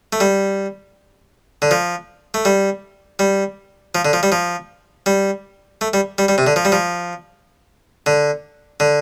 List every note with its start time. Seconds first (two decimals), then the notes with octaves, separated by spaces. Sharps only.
0.13 A3
0.20 G3
1.62 D3
1.71 F3
2.34 A3
2.45 G3
3.19 G3
3.95 F3
4.05 D3
4.13 F3
4.23 G3
4.32 F3
5.06 G3
5.81 A3
5.94 G3
6.18 G3
6.28 G3
6.38 C3
6.47 D3
6.56 F3
6.65 G3
6.72 F3
8.06 D3
8.80 D3